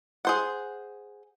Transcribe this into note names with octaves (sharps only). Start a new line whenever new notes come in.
G#4 C5 F#5